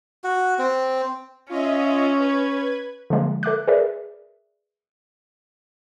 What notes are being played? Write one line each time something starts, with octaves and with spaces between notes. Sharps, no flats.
F#4
C4
C#4 F4 D#5 E5
B4 G#6
D3 F3 G#3 A#3
A4 E5 D6 F#6
G#4 A#4 B4 D5 E5